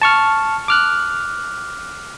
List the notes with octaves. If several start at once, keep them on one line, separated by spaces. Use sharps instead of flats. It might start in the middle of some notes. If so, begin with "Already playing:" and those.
A5 C#6 F6
D6 F6 F#6